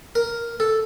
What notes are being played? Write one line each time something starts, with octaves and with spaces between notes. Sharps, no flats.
A#4
A4